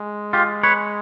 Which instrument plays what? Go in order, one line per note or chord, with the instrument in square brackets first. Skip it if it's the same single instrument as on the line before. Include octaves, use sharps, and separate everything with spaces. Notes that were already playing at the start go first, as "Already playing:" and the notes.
Already playing: [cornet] G#3
[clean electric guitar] F4 G4
B4 C#5